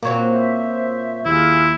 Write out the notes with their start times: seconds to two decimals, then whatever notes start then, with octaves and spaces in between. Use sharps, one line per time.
0.03 A#2 F#3 A#3 C4 F#4 C#5
0.32 C5 E5
1.26 D#2 E4 F4 G#4